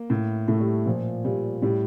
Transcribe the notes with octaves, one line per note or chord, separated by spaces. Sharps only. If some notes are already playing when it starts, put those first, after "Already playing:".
Already playing: A#3
A2
A2 A3
G3
A#2 F3
A#2 G3
A2 G3